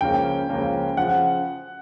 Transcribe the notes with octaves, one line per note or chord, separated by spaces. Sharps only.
C#2 C#3 F3 A#3 C#4 G5
C#2 C#3 F3 A#3 C#4
C#3 F3 F#5